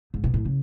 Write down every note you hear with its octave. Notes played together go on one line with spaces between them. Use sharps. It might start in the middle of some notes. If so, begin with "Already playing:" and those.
G#2
B2
A2
C#3